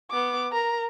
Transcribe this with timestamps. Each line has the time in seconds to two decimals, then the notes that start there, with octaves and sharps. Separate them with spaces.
0.11 B3 D6
0.51 A#4 A#5